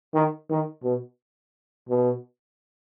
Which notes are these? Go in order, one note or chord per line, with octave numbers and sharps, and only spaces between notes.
D#3
D#3
B2
B2